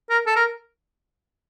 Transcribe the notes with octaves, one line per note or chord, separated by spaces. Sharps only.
A#4
A4
A#4